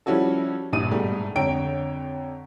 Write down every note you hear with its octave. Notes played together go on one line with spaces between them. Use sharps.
F3 G3 C#4 E4 F#4 A4
A#1 G2 D#6 D#7
G#2 B2 G3 A3
F2 D3 C#5 G5 A#5 D7